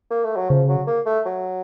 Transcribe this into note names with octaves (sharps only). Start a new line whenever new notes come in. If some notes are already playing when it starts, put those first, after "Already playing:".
A#3
A3
F#3
C#3 F3
F#3
A#3
A3
F#3